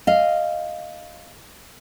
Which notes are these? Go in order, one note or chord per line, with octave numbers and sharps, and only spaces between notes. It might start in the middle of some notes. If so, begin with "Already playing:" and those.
D#5 F5